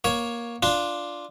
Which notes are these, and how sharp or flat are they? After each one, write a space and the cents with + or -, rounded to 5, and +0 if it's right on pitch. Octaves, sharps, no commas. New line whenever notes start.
A#3 +15 C#5 +0
D4 +0 F4 +0